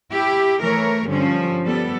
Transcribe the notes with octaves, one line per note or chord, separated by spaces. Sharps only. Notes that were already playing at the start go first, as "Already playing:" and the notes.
E4 G4
E3 A3 A#4 C#5
G2 D3 F3 C#4
G3 B3 A4